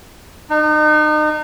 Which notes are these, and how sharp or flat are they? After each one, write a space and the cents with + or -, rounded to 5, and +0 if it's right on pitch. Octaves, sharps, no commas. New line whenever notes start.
D#4 -35